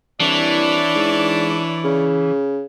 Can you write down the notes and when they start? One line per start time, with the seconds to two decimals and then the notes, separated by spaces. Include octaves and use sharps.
0.20 C2 E3 D4 E4 C#5 D5
0.96 G#2
1.85 C#3